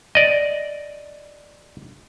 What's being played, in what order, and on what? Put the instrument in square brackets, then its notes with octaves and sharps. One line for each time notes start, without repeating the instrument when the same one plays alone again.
[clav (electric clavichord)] D5 D#5